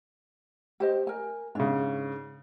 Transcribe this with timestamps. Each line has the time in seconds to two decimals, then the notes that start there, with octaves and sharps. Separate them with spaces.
0.80 G4 C5 D#5
1.07 A#4 G#5
1.55 G#2 C#3 D4